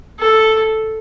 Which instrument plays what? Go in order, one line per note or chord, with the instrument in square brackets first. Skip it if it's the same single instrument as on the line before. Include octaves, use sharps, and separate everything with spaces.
[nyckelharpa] A4